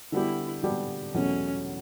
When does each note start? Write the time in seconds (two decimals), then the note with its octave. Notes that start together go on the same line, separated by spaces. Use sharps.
0.12 D3 G3 B3 D4 E4 G4
0.63 D3 G3 B3 D4 G4
1.14 E2 B2 F#3 A3 C#4